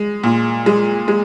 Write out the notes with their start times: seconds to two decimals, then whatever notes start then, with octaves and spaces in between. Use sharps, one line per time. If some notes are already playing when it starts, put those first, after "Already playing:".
Already playing: G#3
0.23 A#2
0.66 G#3
1.08 G#3